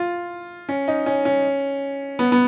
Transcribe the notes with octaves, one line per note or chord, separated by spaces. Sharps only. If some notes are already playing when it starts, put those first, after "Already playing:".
Already playing: F4
C#4
D#4
C#4
C#4
B3
B3